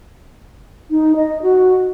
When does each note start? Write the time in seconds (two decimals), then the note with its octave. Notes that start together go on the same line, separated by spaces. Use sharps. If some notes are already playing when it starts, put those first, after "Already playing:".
0.91 D#4
1.16 D#5
1.42 F#4